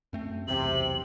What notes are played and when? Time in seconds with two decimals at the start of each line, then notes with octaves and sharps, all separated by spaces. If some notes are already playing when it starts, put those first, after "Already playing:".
0.13 F#2 A3 C4
0.48 B1 E2 C3 F#7